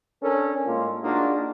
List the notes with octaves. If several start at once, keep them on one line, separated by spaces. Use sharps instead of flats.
C#4 D4 A4 A#4
A2 G#3 A#3 F4
A#3 D4 D#4 F4 F#4 G#4